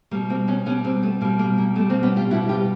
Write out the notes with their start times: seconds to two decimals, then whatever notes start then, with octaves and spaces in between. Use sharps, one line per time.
0.11 B2 G3 A#3
0.30 A#3 C4
0.48 B3 C#4
0.65 B2 B3 C#4
0.70 G3
0.84 A#3 C4
1.03 A3 B3
1.21 B2 A#3
1.25 G3
1.39 A#3
1.58 A#3
1.75 B2 A3
1.80 G3
1.90 A#3 C4
2.03 B3 C#4
2.16 F4 G4
2.31 G3 E4 F#4
2.35 B2
2.49 F4 G4